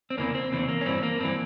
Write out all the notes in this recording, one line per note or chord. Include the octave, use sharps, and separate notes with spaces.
C4
E2 C#3 E3 A#3
C4
E2 C#3 E3 C4
A#3
C#4
G2 E3 C4
A#3
G2 E3 C4